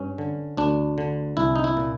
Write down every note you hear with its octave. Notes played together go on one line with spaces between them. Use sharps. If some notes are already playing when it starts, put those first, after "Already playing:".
Already playing: G2 C#4
D3
D2 D4
D3
C2 E4
D#4
E4
A#2